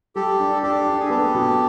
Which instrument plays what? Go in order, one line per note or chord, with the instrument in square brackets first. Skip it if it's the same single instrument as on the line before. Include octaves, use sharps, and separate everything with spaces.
[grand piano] G3 [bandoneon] G4 A4
[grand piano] D4
[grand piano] D4 [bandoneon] G4 A4
[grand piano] D4
[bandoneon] G#4
[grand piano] B3 [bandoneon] G4 A4
[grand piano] B2